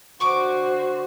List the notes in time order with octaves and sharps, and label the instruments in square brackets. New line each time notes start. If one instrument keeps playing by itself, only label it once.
[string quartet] D3 F#4 C5 [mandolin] C#6 D6